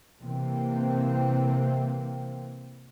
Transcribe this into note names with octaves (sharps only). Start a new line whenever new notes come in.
C3 E3 A#3 C4